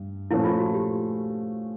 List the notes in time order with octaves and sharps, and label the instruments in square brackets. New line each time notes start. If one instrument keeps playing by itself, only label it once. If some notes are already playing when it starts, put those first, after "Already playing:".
Already playing: [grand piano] G2
[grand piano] A#2 F3 A3 C#4 [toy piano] E4
[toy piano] F4
F#4
G4